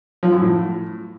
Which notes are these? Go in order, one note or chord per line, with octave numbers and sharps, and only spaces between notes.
F3
F#2
A2